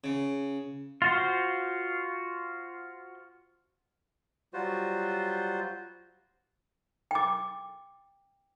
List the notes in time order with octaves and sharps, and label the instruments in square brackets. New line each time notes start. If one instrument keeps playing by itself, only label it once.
[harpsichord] C#3
[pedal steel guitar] F4 F#4 C5
[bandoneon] F#3 G3 F4 F#4 C5
[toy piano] G5 D6